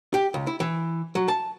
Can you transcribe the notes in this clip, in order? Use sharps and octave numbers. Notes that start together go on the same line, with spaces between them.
G4
C#2
E4
E3
F#3
A5